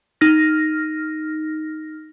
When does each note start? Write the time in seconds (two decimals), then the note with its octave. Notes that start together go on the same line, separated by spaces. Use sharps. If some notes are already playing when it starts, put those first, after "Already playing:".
0.21 D#4 F6 A#6